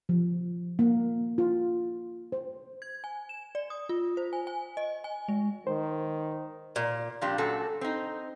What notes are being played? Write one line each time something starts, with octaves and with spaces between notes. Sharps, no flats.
F3
A#3
F4
C5
G#6
G#5
E7
D5
D#6
F4
C5
G#5
G#5
D#5
G#5
G#3
D#3 C5
A#2
F2 A#2 C4 D4 G4
F#2 A#2 F#4 A4
C4 D#4